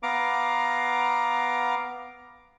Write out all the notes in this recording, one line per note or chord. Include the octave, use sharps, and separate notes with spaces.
B3 F5 A#5 D6